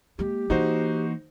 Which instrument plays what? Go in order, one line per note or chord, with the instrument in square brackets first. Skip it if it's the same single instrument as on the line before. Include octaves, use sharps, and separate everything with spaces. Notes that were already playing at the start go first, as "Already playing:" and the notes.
[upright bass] G#3 A#3 [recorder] G4
[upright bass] E3 A#3 [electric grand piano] D#4 F#4 C5